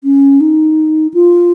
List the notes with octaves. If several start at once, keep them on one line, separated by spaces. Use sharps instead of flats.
C#4
D#4
F4